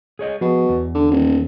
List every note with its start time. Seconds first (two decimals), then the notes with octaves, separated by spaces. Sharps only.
0.19 G#4 C#5 D#5
0.41 B2 F3 G#4
0.69 E2
0.95 D3
1.11 D#1